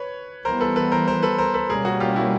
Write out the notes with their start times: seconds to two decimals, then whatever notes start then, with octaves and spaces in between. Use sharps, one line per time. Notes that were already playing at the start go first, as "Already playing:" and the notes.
Already playing: B4 C#5
0.45 E3 G3 B3 A#4 C5
0.60 A4 B4
0.76 A4 B4
0.92 A#4 C5
1.08 A#4 C5
1.23 A4 B4
1.38 A#4 C5
1.54 A4 B4
1.70 B2 G3 A#3 C#4 G#4 A#4
1.85 F#4 G#4
2.00 F4 G4
2.16 E4 F#4